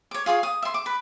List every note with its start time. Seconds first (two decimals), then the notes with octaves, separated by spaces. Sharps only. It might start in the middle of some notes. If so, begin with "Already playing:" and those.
0.11 C#5 D6
0.26 F4 G#4 C5 C#5
0.43 D#6
0.62 E5 C6
0.74 D6
0.86 B4